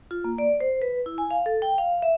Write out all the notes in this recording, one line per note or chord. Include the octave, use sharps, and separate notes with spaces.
F4
A#3
D5
C5
B4
E4
G#5
F5
A4
G5
F5
E5